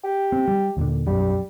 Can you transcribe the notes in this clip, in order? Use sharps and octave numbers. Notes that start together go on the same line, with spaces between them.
G4
C4
G3
D#2 A#2 D3
B1 F#2 G3